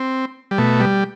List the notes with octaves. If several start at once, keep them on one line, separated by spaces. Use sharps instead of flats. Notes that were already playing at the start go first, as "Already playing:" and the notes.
Already playing: C4
G3
B2 A3
G3